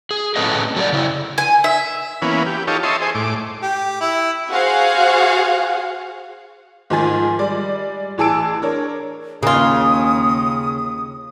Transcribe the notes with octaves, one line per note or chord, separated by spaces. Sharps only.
G#4
A2 C4 C#4 A4 B4 D#5
F#3 A4 D5
C#3 E4
G#5
E5
E3 A#3 B3 C#4
G4
D#4 F4 G4 A4 C#5
C#5 D#5 E5 A5 C6
G#4 C5
A2 D6
G4
E4
F#4 G#4 C5 F5 F#5
G#2 D#3 F3 G#5 A6
G3 G#3 D5
A1 E3 G#4 A5 E6 D7
D4 A#4 C#5
D#2 C#3 A#3 F4 D#6